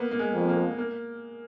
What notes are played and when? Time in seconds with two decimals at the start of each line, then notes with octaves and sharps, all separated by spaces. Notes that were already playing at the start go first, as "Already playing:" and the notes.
Already playing: A#3 B3
0.11 A#3
0.19 G#3
0.33 F2
0.49 A#3
0.78 A#3